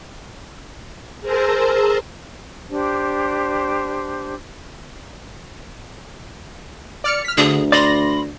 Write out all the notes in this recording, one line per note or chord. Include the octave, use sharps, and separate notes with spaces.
G#4 A#4 C5 A5 A#5 E6
D4 G4 C5
D5 F6 C#7
F6 B6
D2 D3 G#4
D5 B5 C6 A#6